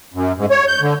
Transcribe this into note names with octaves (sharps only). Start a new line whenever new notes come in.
F#2
G#2
C#5
G6
D3